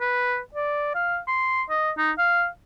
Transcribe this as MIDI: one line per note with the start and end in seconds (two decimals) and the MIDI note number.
0.01 0.39 71
0.55 0.91 74
0.95 1.19 77
1.27 1.62 84
1.70 1.91 75
1.98 2.12 63
2.18 2.47 77